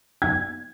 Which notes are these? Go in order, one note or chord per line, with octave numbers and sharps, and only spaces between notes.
G#6